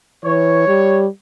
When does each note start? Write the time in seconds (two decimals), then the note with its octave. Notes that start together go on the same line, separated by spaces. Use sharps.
0.24 E3 C#5
0.67 G3